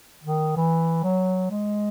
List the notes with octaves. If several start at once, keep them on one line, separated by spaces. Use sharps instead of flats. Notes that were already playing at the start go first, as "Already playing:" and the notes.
D#3
E3
F#3
G#3